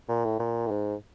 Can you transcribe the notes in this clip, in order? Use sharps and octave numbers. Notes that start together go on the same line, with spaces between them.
A#2
A2
A#2
A2
G#2